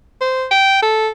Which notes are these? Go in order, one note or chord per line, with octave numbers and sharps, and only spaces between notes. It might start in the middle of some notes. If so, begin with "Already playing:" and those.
C5
G5
A4